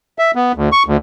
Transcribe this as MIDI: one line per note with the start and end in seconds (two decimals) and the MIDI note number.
0.19 0.31 76
0.35 0.52 59
0.55 0.69 38
0.72 0.83 85
0.86 0.97 38